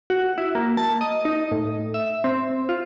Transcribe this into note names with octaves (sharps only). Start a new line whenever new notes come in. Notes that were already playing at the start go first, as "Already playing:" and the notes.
F#4
E4
A#3
A5
D#5
D#4
A2
E5
C4
F4